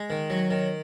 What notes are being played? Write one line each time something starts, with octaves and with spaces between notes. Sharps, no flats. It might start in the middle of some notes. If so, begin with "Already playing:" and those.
Already playing: G#3
D#3
F#3
D#3